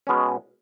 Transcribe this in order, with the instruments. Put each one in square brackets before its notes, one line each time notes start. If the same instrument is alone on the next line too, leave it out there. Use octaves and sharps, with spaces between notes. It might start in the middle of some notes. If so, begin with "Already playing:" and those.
[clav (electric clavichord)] B2 G#3 C#4